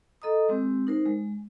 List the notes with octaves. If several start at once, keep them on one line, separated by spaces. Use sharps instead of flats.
A4 D#5 A#5 D#6
G#3 C4 G4
D#4 A#4 C5
G#3